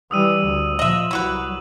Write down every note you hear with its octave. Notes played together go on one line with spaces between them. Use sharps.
E3 G3 D#6 E6 D#7
D2
A#2 F3 D#5 E5 D#6 E7 F#7
C2 F#3 E4 F#4 B4